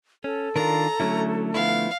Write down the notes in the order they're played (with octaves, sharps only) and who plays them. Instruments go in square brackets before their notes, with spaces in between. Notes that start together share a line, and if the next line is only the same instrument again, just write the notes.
[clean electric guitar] C#4 [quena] A4
[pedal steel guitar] D#3 D4 F4 [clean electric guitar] A#4 [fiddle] A#5
[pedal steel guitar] D3 A3 [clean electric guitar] F#3 C#4 E4
[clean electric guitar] F3 B3 E4 [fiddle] F5